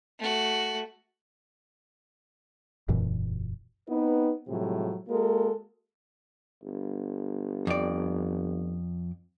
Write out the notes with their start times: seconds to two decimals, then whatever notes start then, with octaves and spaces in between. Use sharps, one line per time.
0.19 A3 F#4
2.88 E1 F#2 A#2 E3
3.88 B3 C4 D#4 B4
4.48 A2 C3 F3 F#3 G#3
5.08 G#3 A#3 F#4 A4 A#4
6.63 G1
7.67 F2 D5